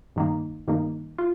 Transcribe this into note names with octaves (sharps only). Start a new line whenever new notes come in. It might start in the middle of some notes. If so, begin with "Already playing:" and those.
G2 D#3 A#3
G2 D#3 A#3
F4